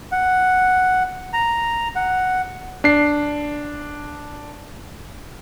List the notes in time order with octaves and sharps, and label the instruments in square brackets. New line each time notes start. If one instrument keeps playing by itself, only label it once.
[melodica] F#5
A#5
F#5
[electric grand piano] D4 C7